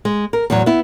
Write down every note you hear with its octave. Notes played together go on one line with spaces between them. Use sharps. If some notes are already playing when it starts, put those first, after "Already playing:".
G#3
A#4
E2 A2 F#3
B3 E4